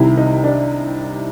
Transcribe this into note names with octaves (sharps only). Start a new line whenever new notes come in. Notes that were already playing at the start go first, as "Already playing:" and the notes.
Already playing: C2 C3 D#3 E4
D#4
D4